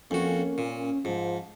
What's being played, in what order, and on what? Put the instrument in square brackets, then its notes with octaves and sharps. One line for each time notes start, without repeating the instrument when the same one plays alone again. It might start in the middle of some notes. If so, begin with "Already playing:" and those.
[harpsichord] F2 F#4 [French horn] A#3 [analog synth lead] C#4
[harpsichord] A#2
[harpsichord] G#2 [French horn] F3